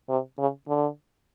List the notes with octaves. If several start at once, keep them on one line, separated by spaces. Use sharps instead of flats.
C3
C#3
D3